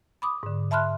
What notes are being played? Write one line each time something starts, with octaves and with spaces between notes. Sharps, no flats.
B5 D6 D#6
G#2 D3
E5 A5 B5 C6 F6 F#6